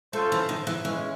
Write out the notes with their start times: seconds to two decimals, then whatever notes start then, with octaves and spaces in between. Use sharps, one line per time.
0.13 A3 C#4 F4 A4 C5
0.32 E3
0.49 D#3
0.67 E3
0.84 E3 G#3 C#4